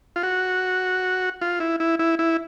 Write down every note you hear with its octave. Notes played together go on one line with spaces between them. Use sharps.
F4
F#4
F4
E4
E4
E4
E4